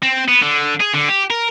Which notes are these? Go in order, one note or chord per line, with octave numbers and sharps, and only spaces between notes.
C4
B3
D3
G#4
D3
G4
A#4